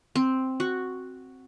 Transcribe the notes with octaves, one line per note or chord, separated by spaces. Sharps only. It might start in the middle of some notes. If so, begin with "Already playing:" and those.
C4
F#4